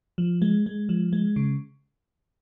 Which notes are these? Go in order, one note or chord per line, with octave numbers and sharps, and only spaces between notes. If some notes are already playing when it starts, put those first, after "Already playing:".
F3
G#3
G#3
F3
G#3
C#3